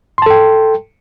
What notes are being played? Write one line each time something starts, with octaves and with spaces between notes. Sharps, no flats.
A4 G5 A5 C6